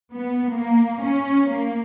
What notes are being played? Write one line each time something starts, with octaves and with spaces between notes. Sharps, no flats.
B3
A#3
C#4
A#3